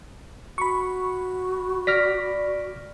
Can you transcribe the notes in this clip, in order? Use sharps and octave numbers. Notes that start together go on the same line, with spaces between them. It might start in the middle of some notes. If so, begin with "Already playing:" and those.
F#4 B5 C#6
D5 F6 A#6 B6